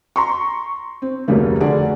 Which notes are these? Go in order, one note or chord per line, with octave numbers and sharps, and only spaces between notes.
A#5 C6 C#6
C4
F1 D2 C#3 G3 A#3
F1 D3 F#4 G#4 D5